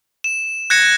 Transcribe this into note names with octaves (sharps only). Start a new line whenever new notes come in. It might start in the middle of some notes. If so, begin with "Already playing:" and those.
E7
F#6 G#6 A#6 C#7 E7